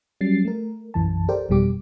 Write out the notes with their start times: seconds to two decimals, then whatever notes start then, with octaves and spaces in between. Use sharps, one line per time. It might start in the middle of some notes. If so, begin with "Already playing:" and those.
0.21 F#3 G3 C#4 A6 C7
0.45 A3 A#4
0.94 B1 F#2 E3 A5
1.28 G4 A4 A#4 C5 D5 G5
1.49 G1 F2 B2 G3 G4 D6